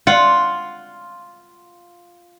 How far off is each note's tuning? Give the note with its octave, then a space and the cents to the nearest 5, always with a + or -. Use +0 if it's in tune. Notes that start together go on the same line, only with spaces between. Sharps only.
F4 +0 F#5 +0